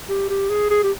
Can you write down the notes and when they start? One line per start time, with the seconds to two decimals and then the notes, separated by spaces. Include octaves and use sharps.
0.09 G4
0.29 G4
0.49 G#4
0.70 G#4
0.83 G4